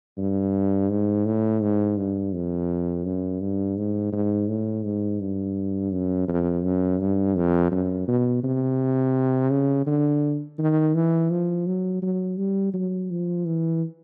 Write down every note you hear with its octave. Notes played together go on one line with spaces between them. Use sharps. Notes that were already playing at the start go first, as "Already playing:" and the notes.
G2
G#2
A2
G#2
G2
F2
F#2
G2
G#2
G#2
A2
G#2
G2
F#2
F2
F#2
G2
F2
F#2
B2
C3
C#3
D3
D#3
E3
F3
F#3
F#3
G3
F#3
F3
E3